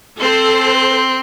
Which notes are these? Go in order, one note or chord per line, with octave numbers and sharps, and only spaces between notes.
C4 A4 C5